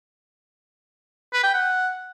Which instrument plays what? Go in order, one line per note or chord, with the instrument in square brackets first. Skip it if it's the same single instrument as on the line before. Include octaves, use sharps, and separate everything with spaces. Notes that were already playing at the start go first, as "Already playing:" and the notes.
[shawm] B4
G5
F#5